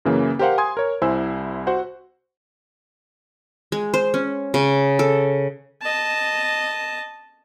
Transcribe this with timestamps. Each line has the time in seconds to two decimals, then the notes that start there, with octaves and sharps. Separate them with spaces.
0.05 F#2 C#3 E3 A#3 C#4
0.39 G4 A#4 C5 F5 F#5
0.58 G#5 C6 D#6 G#6
0.77 A#4 C#5
1.02 C2 E4 C5 G#5 E6
1.67 F#4 C5 F#5
3.72 G#3
3.94 C5
4.14 C#4
4.54 C#3
4.99 A4
5.82 D#5 A5